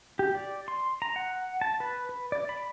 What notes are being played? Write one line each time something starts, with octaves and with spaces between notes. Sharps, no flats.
G4
D5
C6
A#5
F#5
A5
B4
B4
D5
B5